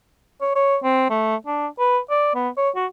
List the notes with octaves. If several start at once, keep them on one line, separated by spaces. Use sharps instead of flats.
C#5
C#5
C4
A3
D4
B4
D5
B3
C#5
F#4